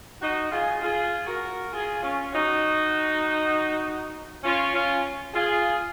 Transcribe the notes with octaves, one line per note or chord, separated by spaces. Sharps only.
D#4 F#4
F4 G#4
F4 G#4
F#4 A#4
F4 G#4
C#4 F4
D#4 F#4
C#4 F4
C#4 F4
F4 G#4